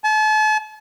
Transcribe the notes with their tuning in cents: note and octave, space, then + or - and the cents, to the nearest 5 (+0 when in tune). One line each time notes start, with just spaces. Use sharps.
A5 -40